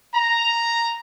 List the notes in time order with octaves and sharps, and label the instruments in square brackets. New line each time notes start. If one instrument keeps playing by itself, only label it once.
[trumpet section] A#5